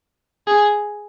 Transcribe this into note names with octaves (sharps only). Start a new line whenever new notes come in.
G#4